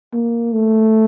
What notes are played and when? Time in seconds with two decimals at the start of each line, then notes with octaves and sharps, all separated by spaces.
0.13 A#3
0.54 A3